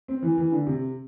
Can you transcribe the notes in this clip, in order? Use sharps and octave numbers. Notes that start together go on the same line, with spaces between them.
C4
E3
E3
D3
C3